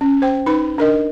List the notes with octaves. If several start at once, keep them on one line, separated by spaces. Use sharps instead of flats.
C#4
C5 G5
D#4 B4 B5
D4 A#4 D#5